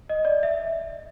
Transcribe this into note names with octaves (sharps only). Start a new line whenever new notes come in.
D#5
D5
E5